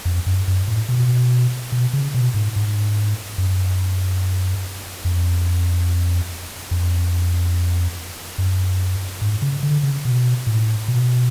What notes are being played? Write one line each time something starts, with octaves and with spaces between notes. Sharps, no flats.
F2
F#2
F#2
A2
B2
B2
C#3
B2
G#2
G#2
F#2
F2
F2
F#2
G#2
C#3
D3
C#3
B2
A2
B2